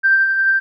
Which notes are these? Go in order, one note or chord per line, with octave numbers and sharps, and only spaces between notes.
G6